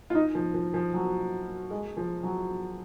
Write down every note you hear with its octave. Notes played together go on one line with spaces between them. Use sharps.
F4
D#4
F3
F3
F3
F#3
G#3
F3
F#3